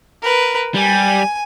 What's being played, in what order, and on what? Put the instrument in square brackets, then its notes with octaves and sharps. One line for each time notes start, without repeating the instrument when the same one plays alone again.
[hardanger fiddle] A#4 B4
[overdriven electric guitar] G3 [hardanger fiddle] G#5